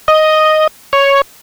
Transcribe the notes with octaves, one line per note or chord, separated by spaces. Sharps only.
D#5
C#5